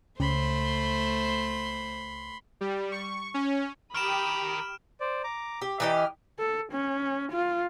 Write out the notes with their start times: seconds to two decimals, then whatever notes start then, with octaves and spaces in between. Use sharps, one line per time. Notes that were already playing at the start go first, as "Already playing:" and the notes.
0.20 C#2 C#3 A3 C5 B5 C6
2.61 G3
2.92 C#6
3.34 C#4
3.95 D#3 G4 A#4 B5 D#6 F6 D7 E7
5.00 C5 D5
5.24 A#5 D6
5.61 G4
5.80 E3 G4 D5 D#5 G5 A#5
5.96 F6
6.39 A4
6.72 C#4
7.32 F4